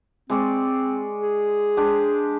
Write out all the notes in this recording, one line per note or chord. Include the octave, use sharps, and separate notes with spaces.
G#3 C4 D5 C#6
G#4
G#3 D4 G4